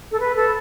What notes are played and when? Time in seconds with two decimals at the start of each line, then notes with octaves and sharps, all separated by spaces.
0.11 A4
0.19 B4
0.36 A4